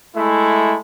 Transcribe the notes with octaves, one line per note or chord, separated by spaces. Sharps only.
G#3 A3 E4